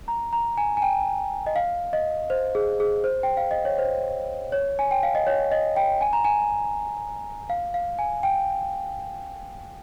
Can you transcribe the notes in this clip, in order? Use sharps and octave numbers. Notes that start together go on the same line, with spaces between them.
A#5
A#5
G#5
G#5
G5
D#5
F5
D#5
C5
G#4
G#4
C5
G5
F5
D#5
C#5
C5
C#5
G#5
G5
F5
D#5
C#5
D#5
G5
G#5
A#5
G#5
F5
F5
G#5
G5